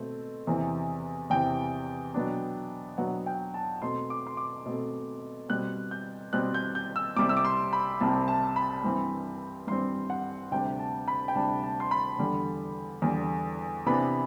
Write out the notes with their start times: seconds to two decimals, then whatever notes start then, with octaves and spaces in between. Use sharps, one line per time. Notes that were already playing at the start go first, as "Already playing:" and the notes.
Already playing: B2 A3 C4
0.47 E2 C3 E3
1.30 E2 C3 E3 G5
2.14 B2 F#3 B3 D4
2.98 B2 F#3 B3 D4 F#5
3.26 G5
3.54 A5
3.82 B2 A3 C4 C6
4.10 D6
4.27 C6
4.37 D6
4.66 B2 A3 C4
5.49 B2 G3 C4 F#6
5.91 G6
6.33 B2 G3 C4 F#6
6.54 G6
6.75 G6
6.96 E6
7.17 C2 C3 G3 C4 D6
7.29 E6
7.37 D6
7.45 C6
7.73 B5
8.00 C2 C3 G3 C4 A5
8.28 A5
8.56 B5
8.84 G2 E3 G3 C4
9.67 G2 E3 G3 C4 C6
10.10 F#5
10.51 D2 C3 G3 D4 G5
10.79 A5
11.08 B5
11.28 G5
11.35 D2 C3 G3 D4 A5
11.63 A5
11.80 C6
11.91 B5
12.19 E2 D3 G3
13.02 E2 D3 G3
13.86 C3 E3 B3 D4 B5